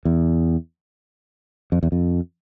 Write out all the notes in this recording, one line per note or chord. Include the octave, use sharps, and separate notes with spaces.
E2
F2
E2
F2